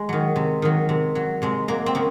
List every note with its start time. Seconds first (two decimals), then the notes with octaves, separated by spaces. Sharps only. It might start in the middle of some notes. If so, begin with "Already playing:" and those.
Already playing: G#3
0.09 D#3 F#3
0.36 C3
0.62 D#3 F#3
0.89 C3
1.15 F#3
1.42 C3 G#3
1.68 F#3 A#3
1.86 C4
1.95 C#3 A#3